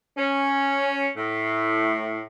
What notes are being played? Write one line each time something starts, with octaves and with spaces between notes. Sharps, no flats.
C#4
A2